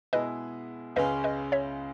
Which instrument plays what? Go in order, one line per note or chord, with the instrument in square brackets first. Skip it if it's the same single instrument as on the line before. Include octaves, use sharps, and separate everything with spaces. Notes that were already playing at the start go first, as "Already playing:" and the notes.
[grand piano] B2 G#3 B3 E4 G#4 [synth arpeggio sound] B4 D#5
[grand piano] C#2 C#3 G#3 C#4 [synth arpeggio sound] B4 D#5
[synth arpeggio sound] B4 D#5
C#5 E5